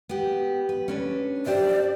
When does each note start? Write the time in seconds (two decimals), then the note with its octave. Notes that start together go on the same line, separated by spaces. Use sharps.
0.09 B3 G4
0.69 B4
0.88 C#4 D4 B4
1.46 G4 C5 D5 E5